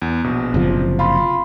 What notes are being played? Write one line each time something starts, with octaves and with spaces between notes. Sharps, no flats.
E2
A#1 B2
F#1 C3 F3
F4 F5 B5 C6